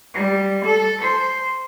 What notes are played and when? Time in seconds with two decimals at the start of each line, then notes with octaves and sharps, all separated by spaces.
0.13 G3
0.64 A4
1.01 C5